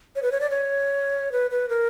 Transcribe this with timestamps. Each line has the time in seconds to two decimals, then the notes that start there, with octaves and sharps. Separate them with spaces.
0.16 C#5
0.22 B4
0.32 C#5
0.40 D5
0.50 C#5
1.32 B4
1.51 B4
1.69 A#4